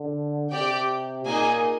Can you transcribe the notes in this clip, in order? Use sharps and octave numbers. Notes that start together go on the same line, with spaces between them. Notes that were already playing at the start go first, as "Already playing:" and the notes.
Already playing: D3
C3 G4 D5 G5
A#2 A#3 D#4 G#4 D#5 G#5